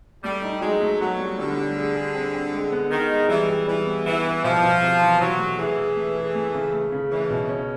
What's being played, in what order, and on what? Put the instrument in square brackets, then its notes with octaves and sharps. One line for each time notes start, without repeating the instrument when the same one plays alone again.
[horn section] G3 [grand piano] A3
[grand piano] D#4
[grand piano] F#3 [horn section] G#3
[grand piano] A3
[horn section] F#3 [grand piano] B3
[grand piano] G3
[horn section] D3 [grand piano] G3
[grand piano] G3
G#4
G#4
C4
C4
G#3
B3
[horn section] D#3 [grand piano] D#4
[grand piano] G#3
[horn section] E3 [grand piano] G3
[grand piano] G3
[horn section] E3 [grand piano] G3
[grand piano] B3
[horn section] E3 [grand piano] B3
[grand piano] E4
[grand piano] B2 [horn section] F3
[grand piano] B2
C3
E3
[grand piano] E3 [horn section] F#3
[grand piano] A3
[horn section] E3 [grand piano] G#4
[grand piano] G#4
A3
G#4
A3
C#3
A3
C#3
[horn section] E3 [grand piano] C#4
[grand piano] B2
C#4